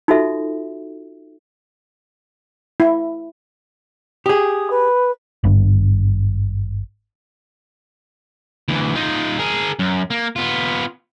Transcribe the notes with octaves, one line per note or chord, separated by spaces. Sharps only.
D#4 F4 F#4 A4 E5
E4
G4 G#4 D#6
B4
G#1 G2
D2 E3
D#4 F4
G#4 A#4
F#2
A#3
B3 F4